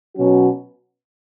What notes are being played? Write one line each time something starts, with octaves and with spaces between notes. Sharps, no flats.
B2 F#3 C#4 F#4